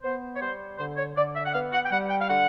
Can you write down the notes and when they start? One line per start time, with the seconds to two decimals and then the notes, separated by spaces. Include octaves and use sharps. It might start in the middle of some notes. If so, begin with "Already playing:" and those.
0.03 B3 C5
0.35 C#5
0.41 G3 C5
0.78 D3 C5
0.97 C#5
1.16 D3 D5
1.35 E5
1.45 F#5
1.54 B3 F5
1.73 F#5
1.85 G5
1.91 G3 F#5
2.10 G5
2.21 F5
2.29 D3 F#5